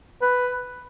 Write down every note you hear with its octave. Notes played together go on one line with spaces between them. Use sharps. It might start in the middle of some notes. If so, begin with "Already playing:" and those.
B4